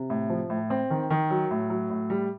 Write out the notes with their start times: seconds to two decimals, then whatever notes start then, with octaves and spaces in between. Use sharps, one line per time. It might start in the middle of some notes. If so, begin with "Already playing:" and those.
Already playing: C3
0.10 A2
0.30 F3
0.50 A2
0.70 C4
0.90 D#3
1.10 D#3
1.30 F#3
1.51 A2
1.70 F#3
1.90 A2
2.10 G3